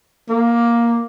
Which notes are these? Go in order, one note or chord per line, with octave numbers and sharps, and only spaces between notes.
A#3